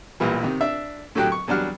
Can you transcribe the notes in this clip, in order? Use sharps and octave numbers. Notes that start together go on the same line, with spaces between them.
B1 A#2 E3 G3
C3 D#3
D4 E5
A2 D3 F#3 G4 G5 F#6
C#6
E2 F#3 G3 D4 F#5 F6